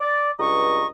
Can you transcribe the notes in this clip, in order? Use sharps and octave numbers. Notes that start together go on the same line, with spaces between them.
D5
C#2 G2 D#5 A#5 C#6